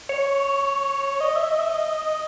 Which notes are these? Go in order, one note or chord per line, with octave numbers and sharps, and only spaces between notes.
C#5
D#5
E5
D#5
E5
D#5